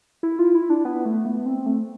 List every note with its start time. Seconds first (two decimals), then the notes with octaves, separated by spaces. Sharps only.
0.23 E4
0.39 F4
0.54 E4
0.70 D4
0.85 B3
1.05 A3
1.25 B3
1.46 C4
1.66 A3